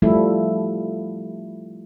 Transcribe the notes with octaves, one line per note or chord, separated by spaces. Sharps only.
F3 G3 A3 E4 A4